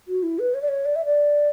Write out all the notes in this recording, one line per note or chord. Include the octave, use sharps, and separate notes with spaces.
F#4
E4
B4
C#5
D5
C#5
D5
E5
D5